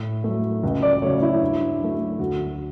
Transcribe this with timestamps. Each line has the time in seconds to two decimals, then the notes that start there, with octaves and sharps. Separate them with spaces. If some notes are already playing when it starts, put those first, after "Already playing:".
Already playing: A2
0.24 F#3 A3
0.64 C#2
0.82 D5
1.02 C#3 F#3 A3 C#5
1.22 E4
1.41 G2
1.80 F#3 A3
2.19 D2 F#4